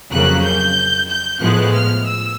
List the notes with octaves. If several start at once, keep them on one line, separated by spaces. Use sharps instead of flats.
F2 C#3 F#3 A#3 F#6
G6
G6
A2 F3 G#3 B3 F#6
F6
E6